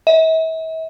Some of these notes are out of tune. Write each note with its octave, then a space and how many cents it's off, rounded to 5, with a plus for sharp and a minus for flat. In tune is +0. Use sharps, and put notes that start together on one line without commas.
E5 -40